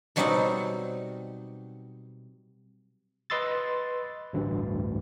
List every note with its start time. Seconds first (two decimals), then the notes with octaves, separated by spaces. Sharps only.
0.16 B2 F#3 G3 C4 D#4 F#5
3.30 B4 D#5 C6 E6 A6
4.33 A1 D2 G2